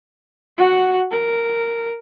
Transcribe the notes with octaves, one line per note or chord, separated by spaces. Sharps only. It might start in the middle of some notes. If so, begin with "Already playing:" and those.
F#4 F#5
A#4